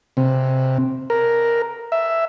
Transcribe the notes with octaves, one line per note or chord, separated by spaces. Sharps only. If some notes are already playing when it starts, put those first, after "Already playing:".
C3
A#4
E5